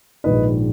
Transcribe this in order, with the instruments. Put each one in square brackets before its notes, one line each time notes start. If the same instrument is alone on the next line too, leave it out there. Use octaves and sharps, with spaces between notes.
[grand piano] A#1 G#2 D#3 B4 D#5